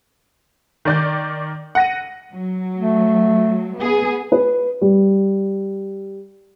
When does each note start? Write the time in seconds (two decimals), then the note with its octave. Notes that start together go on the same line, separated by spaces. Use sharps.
0.85 D#3 D5 G6
1.75 F#5 A#6 D#7
2.33 F#3
2.77 A3
3.79 B3 G#4
4.32 B4
4.81 G3